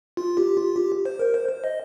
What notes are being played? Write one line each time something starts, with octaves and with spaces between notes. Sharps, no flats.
F4
G4
F4
G4
C5
A#4
C5
C5
D#5